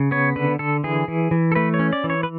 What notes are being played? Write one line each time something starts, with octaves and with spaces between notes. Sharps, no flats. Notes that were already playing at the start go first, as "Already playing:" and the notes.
Already playing: C#3
B3 C#5
D3 B4
D3 A4
E3 G#4
E3
E3
A4
A3 B4
C#5
C#4
D5
E3
C#5
B4